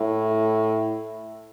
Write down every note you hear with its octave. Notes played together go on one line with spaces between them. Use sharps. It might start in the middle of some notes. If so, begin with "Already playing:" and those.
Already playing: A2